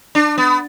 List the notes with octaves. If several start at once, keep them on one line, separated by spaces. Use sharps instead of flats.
D4
B3